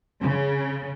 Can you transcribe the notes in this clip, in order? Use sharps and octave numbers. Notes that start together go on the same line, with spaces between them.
C#3